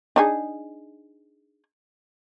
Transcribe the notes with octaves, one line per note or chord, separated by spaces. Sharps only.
D4 D#4 G#4